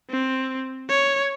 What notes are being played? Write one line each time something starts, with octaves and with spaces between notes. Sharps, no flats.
C4
C#5